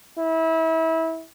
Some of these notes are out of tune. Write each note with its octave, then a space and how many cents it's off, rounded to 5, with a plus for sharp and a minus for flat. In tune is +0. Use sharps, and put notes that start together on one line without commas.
E4 -25